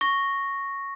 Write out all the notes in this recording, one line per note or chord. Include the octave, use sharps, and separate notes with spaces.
C#6 A#6